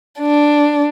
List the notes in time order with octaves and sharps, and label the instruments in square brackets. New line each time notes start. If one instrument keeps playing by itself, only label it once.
[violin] D4